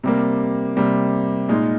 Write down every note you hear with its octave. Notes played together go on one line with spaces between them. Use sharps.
C3 G3 A#3
C3 G3 A#3
A#2 G#3 D#4